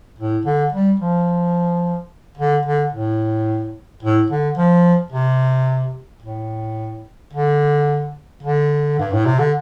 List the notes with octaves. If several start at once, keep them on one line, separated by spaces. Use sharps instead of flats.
A2
D3
G3
F3
D3
D3
A2
A2
D3
F3
C3
A2
D3
D3
G2
A2
C3
D3